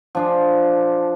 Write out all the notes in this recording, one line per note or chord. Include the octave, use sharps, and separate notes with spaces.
F3 D4 G#4